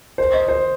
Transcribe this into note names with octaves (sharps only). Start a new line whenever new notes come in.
C5
D#5
C5